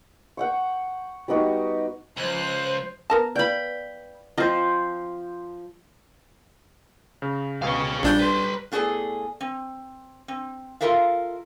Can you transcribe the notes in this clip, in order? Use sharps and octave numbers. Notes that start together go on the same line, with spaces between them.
F#5 G5 C#6
G3 B3 D#4 F#4
C#2 F3 C5 F#6
B3 A#4 A5
B4 D5 F5 G5 B5
F3 C4 F4 C5 D#5
C#3
C#2 B2 C#5 F5
A#1 G3 D4 G6
B4 C6
A2 B3 G#4 A4 D5 G#5
C4
C4
F4 G4 A4 A#4 E5 F5